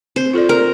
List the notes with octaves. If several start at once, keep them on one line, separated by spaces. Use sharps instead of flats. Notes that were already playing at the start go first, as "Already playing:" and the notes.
C4 C5
F4 A4 D5
C4 A#4